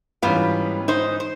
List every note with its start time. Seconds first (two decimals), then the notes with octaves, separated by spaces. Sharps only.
0.22 G#2 E3 G3 B3 C#4 F4
0.88 D#4 C5
1.20 C5